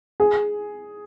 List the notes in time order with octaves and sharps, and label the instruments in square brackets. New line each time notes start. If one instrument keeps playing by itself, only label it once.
[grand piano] G#4